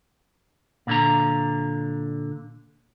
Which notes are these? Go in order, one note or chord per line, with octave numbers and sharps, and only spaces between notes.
A#2 D3 A#5